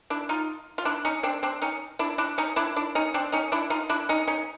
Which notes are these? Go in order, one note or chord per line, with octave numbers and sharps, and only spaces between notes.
D4 E4
D#4 F4
F4
D4 E4
C#4 D#4
C4 D4
C4 D4
C#4 D#4
D4 E4
D4 E4
C#4 D#4
D4 E4
D4 E4
C#4 D#4
C4 D4
C#4 D#4
D4 E4
D#4 F4
D4 E4
C#4 D#4
C#4 D#4